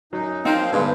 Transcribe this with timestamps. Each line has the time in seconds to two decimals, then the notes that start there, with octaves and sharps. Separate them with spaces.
0.13 F#2 F#3 D#4
0.45 F3 A#3 C4 D#4 C5 F5
0.72 G2 D3 G#3 B3